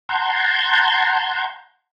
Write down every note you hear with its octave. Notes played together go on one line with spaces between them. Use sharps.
F#5 A5 A#5 C6 G6 G#6